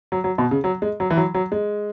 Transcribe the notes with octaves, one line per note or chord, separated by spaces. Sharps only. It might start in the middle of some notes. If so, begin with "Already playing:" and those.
F#3
F#3
B2
C#3
F#3
G#3
F#3
E3
F#3
F#3
G#3